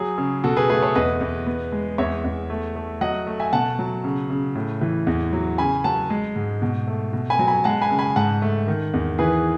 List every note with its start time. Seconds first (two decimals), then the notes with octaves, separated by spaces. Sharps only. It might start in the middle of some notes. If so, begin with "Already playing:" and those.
Already playing: F#3 G#4
0.18 C#3
0.44 B2 F#4 A4
0.57 G#4 B4
0.69 A3 G#4 B4
0.82 A4 C#5
0.95 E2 B4 D#5
1.21 E2
1.46 B3
1.72 G#3
1.98 E2 C#5 E5
2.24 E2
2.50 A3
2.76 A3
3.01 F#3 D#5 F#5
3.27 A3
3.40 E5 G#5
3.53 B2 F#5 A5
3.79 F#3
4.04 C#3
4.30 C#3
4.55 A2
4.81 E3
5.07 E2
5.33 F#3
5.58 C#3 G#5 B5
5.84 F#3 F#5 A5
6.10 G#3
6.36 G#2
6.62 B2
6.87 A3
7.13 B2
7.30 G#5 B5
7.39 F#3
7.47 G#5 B5
7.64 G#3 F#5 A5
7.82 G#5 B5
7.90 C#3
7.99 G#5 B5
8.16 G#2 F#5 A5
8.42 A3
8.68 D#3
8.94 E2
9.19 E3 G#4 B4